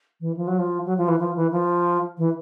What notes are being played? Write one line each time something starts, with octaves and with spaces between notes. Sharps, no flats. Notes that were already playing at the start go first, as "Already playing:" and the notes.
E3
F3
F#3
F3
F#3
F3
E3
F3
E3
F3
E3